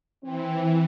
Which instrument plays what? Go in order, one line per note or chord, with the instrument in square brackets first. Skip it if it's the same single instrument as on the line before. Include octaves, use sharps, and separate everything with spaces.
[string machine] E3 [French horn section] C4